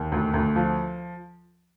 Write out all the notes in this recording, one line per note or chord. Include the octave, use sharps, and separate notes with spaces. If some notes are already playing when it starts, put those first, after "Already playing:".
Already playing: D#2
D2
D2
F3